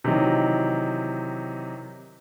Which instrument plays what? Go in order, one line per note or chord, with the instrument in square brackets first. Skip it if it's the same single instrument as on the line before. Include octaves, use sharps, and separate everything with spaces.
[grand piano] C3 D#3 E3 F#3 D#4